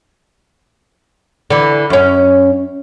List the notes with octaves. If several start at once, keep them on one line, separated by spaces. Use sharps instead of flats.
D3 E3
F#2 C#4